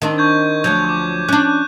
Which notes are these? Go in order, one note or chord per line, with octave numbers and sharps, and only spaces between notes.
D#3 C4 D4
C#6 G6 G#6
D2 F3 F#3 G6 G#6
C#6 D6
C#4 D4 F#6